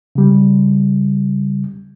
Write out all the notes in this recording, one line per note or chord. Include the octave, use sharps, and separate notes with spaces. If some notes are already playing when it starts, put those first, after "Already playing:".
C#3 G3